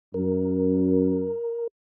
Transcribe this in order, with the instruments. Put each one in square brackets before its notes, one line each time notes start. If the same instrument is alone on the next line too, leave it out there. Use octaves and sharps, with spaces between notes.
[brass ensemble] F#2 [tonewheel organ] A#4